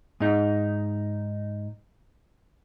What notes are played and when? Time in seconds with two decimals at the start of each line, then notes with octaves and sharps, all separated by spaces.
0.20 G#2 D#4